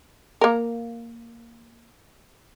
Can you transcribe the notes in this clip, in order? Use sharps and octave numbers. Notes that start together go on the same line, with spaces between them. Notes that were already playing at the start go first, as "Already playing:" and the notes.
A#3 A#4